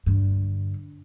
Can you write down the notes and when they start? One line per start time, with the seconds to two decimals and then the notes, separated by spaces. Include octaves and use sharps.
0.06 G2 D3